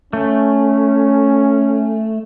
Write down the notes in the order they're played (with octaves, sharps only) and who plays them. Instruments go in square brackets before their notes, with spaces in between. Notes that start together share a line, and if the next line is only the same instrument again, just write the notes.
[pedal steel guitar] A3 [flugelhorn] C#4